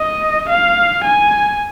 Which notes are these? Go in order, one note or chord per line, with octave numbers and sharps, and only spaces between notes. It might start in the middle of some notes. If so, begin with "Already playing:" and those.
Already playing: D#5
F5
G#5